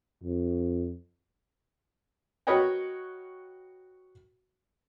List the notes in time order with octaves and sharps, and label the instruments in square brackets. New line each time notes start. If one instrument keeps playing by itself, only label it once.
[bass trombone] F2
[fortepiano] F#4 A#4 B4 C#5 D#5 G5